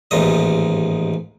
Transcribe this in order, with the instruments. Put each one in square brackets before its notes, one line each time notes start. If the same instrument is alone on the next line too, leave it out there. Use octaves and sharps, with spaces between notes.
[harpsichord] A1 D#2 G#2 D#5